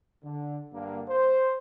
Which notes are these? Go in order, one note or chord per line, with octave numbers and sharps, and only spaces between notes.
D3
G2 D3 A#3
C5